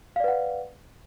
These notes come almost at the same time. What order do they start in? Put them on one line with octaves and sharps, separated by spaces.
F5 D5 B4 F#5